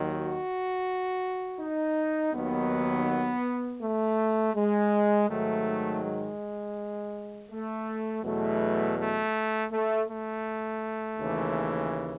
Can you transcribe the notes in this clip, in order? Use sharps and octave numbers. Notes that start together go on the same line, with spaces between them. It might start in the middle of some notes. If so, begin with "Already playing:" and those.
Already playing: D#2 D#3 F#3
F#4
D#4
D#2 D#3 F#3 B3
A3
G#3
G#2 D#3 F#3 A3
G#3
A3
E2 B2 F#3 A3
A3
A3
A3
D#2 C#3 E3